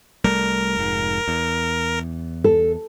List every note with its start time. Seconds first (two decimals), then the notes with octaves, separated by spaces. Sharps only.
0.24 C2 G3 A3 A#4
0.77 F1 G#2
1.28 E2
2.44 A4